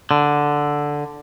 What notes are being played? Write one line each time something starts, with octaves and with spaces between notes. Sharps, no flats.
D3